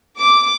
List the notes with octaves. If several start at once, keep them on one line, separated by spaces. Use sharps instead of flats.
D6